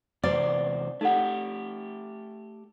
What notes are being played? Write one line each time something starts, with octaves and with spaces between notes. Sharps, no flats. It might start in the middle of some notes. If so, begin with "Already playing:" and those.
E2 C3 B4 C5 D5 D6
A3 D#4 G4 A4 F#5